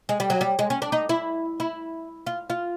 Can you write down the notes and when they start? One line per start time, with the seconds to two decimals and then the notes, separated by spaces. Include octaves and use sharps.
0.09 G#3
0.20 G3
0.30 F#3
0.41 G3
0.59 G#3
0.70 C#4
0.82 D4
0.92 D#4
1.09 E4
1.60 E4
2.27 F4
2.50 F4